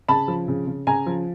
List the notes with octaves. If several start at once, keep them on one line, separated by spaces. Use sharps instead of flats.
C#3 A5 B5
F3
C#3
C#3
C#3 G#5 A#5
F3